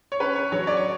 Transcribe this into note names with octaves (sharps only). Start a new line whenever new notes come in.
C#5
C#4 B4
C#5
F#3 C#5
D5
C#5